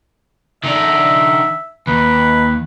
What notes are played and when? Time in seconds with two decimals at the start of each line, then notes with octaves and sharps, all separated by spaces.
0.64 D#3 D4 E5
1.87 D#2 B4